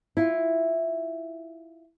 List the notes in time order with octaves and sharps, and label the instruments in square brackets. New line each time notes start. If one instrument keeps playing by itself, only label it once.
[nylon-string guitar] E4 F4